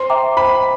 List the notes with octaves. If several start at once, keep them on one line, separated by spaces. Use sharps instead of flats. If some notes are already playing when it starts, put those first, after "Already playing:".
Already playing: C5 C6
E5 G5 A#5 D6
C5 B5